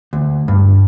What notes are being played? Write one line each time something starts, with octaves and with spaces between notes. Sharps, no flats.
D2
G2